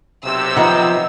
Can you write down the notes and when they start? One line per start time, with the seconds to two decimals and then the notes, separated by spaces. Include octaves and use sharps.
0.24 B1 C3 E6
0.57 D#3 F3 B3 D#4 F#5